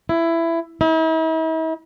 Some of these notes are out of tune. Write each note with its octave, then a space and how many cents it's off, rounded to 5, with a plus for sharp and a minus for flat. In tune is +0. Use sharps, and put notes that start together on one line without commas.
E4 +15
E4 -45